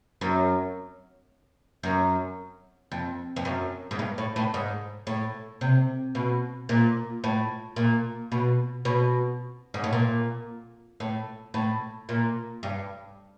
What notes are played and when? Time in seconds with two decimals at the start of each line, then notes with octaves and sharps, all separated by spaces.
0.21 F#2
1.83 F#2
2.92 F2
3.36 F2
3.45 F#2
3.91 G#2
3.99 G2
4.18 A2
4.36 A2
4.54 G#2
5.07 A2
5.61 C3
6.15 B2
6.69 A#2
7.24 A2
7.76 A#2
8.32 B2
8.85 B2
9.74 G#2
9.84 A2
9.93 A#2
11.00 A2
11.54 A2
12.09 A#2
12.63 G2